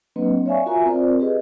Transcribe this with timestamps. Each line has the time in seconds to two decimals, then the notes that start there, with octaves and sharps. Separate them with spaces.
0.16 F#3 A#3 C4 D4 B4 D#5
0.46 C#5 D5 E5 F5 G#5 C#6
0.66 F4 F#4 A#4 E5 G#5 A#5
0.85 C4 F4 A#4 C5 D5
1.20 G4 G#4 B4 D#5